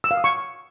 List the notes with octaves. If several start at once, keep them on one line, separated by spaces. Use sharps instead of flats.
E6
F5
D#6
C#6